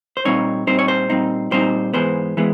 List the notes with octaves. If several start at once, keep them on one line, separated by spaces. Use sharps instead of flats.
C5
A#2 G3 C4 D#4 C#5
A#2 G3 C4 D#4 C5
C#5
C5
A#2 G3 C4 D#4
A#2 G3 C4 D#4 C5
G#2 E3 G#3 B3 C5
E3 G#3 B3